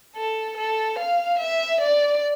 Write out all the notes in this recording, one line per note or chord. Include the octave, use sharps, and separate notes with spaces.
A4
A4
F5
E5
D5